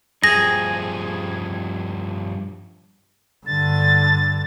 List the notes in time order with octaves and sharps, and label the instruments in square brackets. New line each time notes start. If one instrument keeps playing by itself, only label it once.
[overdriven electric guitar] G2 F3 [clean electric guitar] G#4 [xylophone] A#6
[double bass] G2 D3 [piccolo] A6